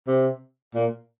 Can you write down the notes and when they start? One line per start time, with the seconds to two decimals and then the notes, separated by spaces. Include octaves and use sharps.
0.07 C3
0.75 A#2